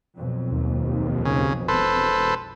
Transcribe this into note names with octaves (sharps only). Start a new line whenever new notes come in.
B1 F2
D#2
C#3
E1 A4 B4 C5